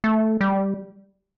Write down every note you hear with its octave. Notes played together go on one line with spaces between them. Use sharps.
A3
G3